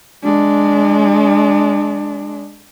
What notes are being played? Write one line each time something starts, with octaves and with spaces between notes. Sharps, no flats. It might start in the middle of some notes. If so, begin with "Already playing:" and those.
G#3 D4